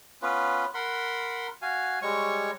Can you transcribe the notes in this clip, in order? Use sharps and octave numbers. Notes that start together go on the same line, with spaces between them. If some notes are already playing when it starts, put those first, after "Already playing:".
B3 C#4 F4 B4
A#4 F#5 B5 C6
F#4 F5 G#5
G3 G#3 C#5 C#6